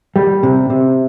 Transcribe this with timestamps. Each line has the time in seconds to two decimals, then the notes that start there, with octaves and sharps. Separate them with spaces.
0.16 G3
0.43 C3
0.70 C3